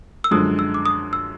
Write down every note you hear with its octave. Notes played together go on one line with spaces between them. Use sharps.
E6
F#2 D3 F3 G#3 D#6
E6
D6
D#6
E6